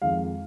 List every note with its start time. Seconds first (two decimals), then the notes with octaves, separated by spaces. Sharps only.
0.02 F2 D#3 G#3 F5